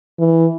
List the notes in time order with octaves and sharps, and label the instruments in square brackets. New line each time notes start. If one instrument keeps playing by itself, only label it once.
[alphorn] E3